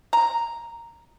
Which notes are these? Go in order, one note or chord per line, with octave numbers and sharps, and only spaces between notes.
A#5